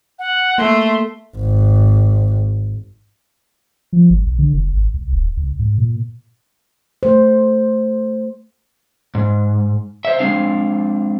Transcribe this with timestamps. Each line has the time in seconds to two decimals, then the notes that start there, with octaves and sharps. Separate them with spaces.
0.19 F#5
0.58 A3 A#3 C6
1.37 G#1
3.93 F3
4.10 G#1
4.26 B1
4.39 D3
4.54 F1
4.73 G#1
4.94 C2
5.13 D#1
5.37 C#2
5.59 G#2
5.78 A#2
7.03 A3 C5
9.15 G#2
10.05 C5 E5
10.19 G#3 C4 D4 F5